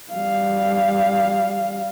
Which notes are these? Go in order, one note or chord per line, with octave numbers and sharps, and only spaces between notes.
G3 F5